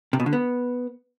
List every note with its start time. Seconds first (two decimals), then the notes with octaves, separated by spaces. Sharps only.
0.13 C3
0.20 B2
0.26 D3
0.33 B3